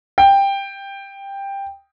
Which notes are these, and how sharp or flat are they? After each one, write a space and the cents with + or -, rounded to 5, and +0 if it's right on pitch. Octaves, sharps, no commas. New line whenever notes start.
G5 +10